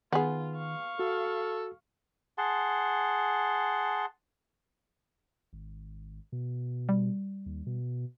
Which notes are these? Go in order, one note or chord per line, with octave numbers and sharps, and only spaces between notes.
D#3 B3 F4 G#4
F5 C#6
F#4 A4
G#4 F#5 A5 C6
G#1
B2
G3
D#2
B2